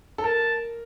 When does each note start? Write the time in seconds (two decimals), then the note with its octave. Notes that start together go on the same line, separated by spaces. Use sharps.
0.18 A4
0.23 A#4 A5